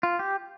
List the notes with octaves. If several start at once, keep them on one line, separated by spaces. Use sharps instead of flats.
F4
G4